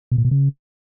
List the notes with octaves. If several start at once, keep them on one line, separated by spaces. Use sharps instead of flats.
B2
A#2
B2
C#3